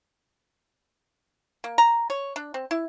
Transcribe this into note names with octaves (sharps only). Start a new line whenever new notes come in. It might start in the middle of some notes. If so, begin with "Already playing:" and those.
A#3
A#5
C#5
D4
C4
E4